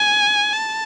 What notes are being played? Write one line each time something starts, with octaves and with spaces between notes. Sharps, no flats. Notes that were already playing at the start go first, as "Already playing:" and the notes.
Already playing: G#5
A5